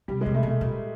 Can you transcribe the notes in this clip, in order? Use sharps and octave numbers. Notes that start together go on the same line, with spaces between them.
C3 G3
G#3
C3
A3
B2
A3
A#2